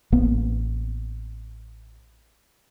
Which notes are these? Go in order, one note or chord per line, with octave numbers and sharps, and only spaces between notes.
A1 A#3 B3